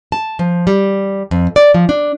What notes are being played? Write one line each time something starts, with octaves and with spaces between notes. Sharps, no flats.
A5
F3
G3
F2
D5
F3
D4